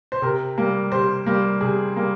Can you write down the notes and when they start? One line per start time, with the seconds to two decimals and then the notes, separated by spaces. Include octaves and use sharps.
0.12 C5
0.22 C3 A#4
0.58 G3 A#3
0.92 C3 C5
1.26 G3 A#3
1.61 C3 G#4
1.96 G3 A#3